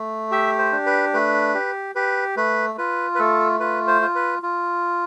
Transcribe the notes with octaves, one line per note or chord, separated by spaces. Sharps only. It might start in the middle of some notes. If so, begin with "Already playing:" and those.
Already playing: A3
G4 E5
C5
D4
B4
A3 B4
G4
G4 B4
A3 B4
F4 B4
B4
A3 A4
F4 B4
C5
F4
B4
F4